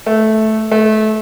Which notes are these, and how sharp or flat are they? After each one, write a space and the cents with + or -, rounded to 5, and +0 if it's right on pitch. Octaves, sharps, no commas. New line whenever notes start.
A3 -10
A3 -25